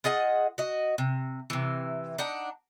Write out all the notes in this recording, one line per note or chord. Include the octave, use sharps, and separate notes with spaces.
F4 G#4 D#5 F#5
F#4 D#5
C3
C3 E3
D4 D#4 F#5